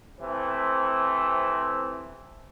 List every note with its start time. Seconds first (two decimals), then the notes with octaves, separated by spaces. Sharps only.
0.20 C3 E3 A3 C4